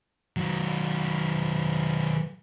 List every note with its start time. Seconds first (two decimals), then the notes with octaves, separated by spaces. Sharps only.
0.37 D#3 F#3